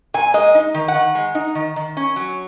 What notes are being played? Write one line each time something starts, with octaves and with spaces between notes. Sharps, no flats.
A#2 G#5
G#3 D#5
D#4
D#3
F#5
D#3
G#3
D#4
D#3
D#3
C#4
F#3